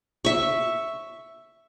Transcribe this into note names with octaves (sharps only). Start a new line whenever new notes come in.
E5 C#6